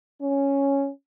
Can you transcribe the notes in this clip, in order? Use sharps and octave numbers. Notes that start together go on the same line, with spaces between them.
C#4